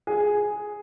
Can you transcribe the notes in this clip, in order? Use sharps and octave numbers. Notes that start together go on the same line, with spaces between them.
G#4